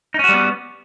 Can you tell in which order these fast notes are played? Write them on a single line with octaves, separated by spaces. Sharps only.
D#4 C#4 F#4 G3 B3